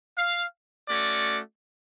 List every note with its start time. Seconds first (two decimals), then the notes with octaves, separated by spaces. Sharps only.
0.18 F5
0.89 A3 C#4 F#4 D5